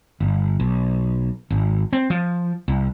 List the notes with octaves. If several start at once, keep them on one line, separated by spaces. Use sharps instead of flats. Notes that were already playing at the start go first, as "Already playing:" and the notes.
G1
B1
G#1
C4
F3
C2